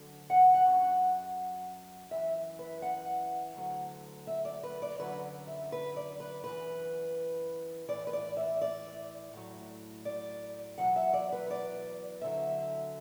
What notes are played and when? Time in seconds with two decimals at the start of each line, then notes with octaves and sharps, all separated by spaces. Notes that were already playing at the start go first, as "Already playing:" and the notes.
Already playing: D2 D3 F#3
0.30 F#5
0.54 F#5
0.65 F#2 F#3
2.10 F#2 E3 E5
2.59 B4
2.82 F#5
3.54 D2 D3 F#3
4.27 E5
4.45 D5
4.63 B4
4.82 D5
4.99 F#2 D3 F#3 B4
5.47 E5
5.72 B4
5.96 D5
6.20 B4
6.44 F#2 E3 B4
7.88 A2 E3 D5
8.07 B4
8.13 D5
8.37 E5
8.61 D5
9.33 A2 F#3
10.05 D5
10.78 E2 B2 F#3 F#5
10.96 E5
11.13 D5
11.32 B4
11.50 D5
12.22 D2 D3 F#3 E5